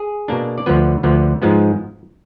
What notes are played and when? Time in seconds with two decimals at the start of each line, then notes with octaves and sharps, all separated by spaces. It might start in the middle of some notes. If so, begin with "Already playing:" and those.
Already playing: G#4
0.28 B2 A#3 D4
0.58 D5
0.66 D2 D3 F3 B3 B4
1.03 D2 D3 F3 B3
1.42 G#2 F3 G#3 B3